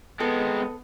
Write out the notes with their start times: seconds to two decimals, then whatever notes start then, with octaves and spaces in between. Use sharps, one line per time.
0.20 G#3 B3 C4 A4